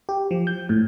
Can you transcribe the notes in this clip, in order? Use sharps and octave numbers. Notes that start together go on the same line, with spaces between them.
G4
F3
G6
A2